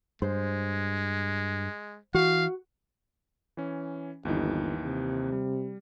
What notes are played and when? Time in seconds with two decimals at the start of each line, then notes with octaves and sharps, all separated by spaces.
0.22 G2 G#3 C5
2.14 E3 F#4 F5
3.57 E3 C#4
4.25 G1 D#2 E3 D#4
4.84 C3
5.32 G3